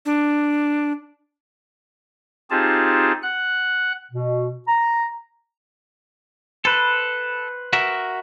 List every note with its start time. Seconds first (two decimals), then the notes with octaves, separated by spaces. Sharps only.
0.05 D4
2.51 C4 D#4 F4 G4 G#4 A5
3.23 F#5 F#6
4.11 B2
4.67 A#5
6.65 A4 B4 C5
7.73 F#4 A#4 E5